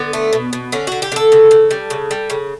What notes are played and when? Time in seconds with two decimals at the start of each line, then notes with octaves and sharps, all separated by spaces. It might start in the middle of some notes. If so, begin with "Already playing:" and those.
Already playing: D3 B3
0.13 A3
0.33 B2
0.53 B2
0.72 D3 C#4
0.87 D3 F#4
1.02 G4
1.12 D3 A4
1.32 C#3
1.51 C#3
1.71 G3
1.90 C#3
2.11 G3
2.30 C#3